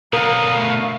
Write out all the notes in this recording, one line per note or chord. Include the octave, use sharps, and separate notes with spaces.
B2 D3 F#3 A#4 F5 A#5 D#6
A3